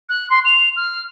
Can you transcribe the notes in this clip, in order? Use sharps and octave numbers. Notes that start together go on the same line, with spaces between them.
F#6
C6
F7
F6